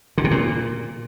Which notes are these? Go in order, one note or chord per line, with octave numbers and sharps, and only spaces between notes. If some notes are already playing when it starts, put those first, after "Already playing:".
D3
C3
A#2